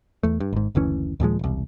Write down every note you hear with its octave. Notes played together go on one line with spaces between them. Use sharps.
E2 A3
G2
G#1 G#2
F#1 D2 E3 C#4
D#2 A#2 F3 G#3
E1 C2